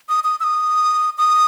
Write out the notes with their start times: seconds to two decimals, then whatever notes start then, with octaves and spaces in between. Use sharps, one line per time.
0.09 D#6
0.24 D#6
0.40 E6
0.44 D#6
1.18 D#6